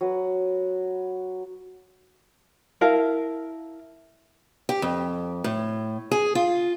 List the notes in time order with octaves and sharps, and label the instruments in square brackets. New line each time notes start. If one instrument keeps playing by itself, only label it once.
[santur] F#3 B4
[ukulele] E4 A#4 F5 A5
[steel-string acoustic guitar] G4
F2
A2
G#4
F4